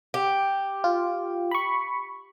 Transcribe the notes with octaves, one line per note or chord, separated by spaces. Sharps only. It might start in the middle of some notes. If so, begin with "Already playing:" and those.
G4
F4
B5 C#6